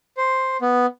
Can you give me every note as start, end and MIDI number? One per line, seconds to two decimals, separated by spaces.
0.17 0.57 72
0.62 0.86 59